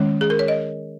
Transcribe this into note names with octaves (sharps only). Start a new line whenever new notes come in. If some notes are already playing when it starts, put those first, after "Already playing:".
Already playing: D#3 G#3 C#4 C#5
G#4
A#4
C#5
D#5